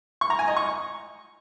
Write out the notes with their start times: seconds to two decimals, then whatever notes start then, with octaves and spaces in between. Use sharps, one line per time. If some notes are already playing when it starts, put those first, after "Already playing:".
0.21 C#6
0.30 A#5
0.39 G#5
0.48 D#5
0.57 C#6